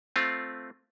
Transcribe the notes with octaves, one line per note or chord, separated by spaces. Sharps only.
A3 C4 F4